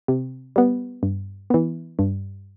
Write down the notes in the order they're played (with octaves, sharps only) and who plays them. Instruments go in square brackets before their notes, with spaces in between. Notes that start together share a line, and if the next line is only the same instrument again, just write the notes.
[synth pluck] C3
G3 B3
G2
E3 B3
G2